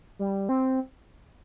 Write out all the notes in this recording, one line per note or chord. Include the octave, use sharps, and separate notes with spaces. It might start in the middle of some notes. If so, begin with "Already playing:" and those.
G3
C4